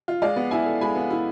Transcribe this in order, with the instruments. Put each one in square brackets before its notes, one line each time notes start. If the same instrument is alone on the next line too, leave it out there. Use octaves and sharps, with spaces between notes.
[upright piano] F4
[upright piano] G#3 [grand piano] D5 F5
[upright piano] B3
[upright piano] E4 [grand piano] E5 G#5
[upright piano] A4
[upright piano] G#3 [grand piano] G#5 B5
[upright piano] B3
E4